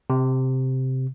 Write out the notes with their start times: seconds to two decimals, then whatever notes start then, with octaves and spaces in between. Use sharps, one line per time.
0.10 C3